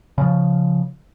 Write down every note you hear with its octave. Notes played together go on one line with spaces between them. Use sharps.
C#3 F3